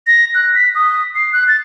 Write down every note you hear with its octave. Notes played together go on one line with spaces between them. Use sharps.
A#6
F#6
B6
D#6
C7
F#6
A6